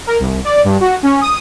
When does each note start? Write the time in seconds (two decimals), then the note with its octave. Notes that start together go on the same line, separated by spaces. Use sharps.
0.07 A#4
0.20 C2
0.44 D5
0.64 G2
0.80 F#4
1.03 C#4
1.21 D#6